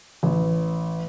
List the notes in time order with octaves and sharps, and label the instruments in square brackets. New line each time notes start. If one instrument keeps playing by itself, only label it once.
[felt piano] A1